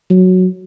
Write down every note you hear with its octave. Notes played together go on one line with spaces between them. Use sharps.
F#3